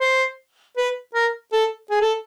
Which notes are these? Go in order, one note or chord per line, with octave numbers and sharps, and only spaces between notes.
C5
B4
A#4
A4
G#4
A4